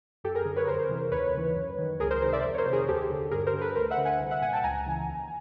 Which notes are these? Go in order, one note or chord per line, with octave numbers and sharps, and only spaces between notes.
F#2 G4 A4
G#4 A#4
D3
B4 C#5
F2 A#4 C5
C3 E3
D#2 B4 C#5
C#3 E3
F#2
D#3
C#2 G#4 A#4
A#4 C5
C3 D#3 A#4 C5
D5 E5
F2
C#5
A#4 C5
C3
D#3 G#4 A#4
D#2 G4 A4
D3
G2 G#4 A#4
A#4 C5
D3
A4 B4
D2 A#4 C5
E5 F#5
D3
F#5 G#5
C2
E5 F#5
A#2 F#5 G#5
G5 A5
C#2 G#5 A#5
C#3 E3
D#2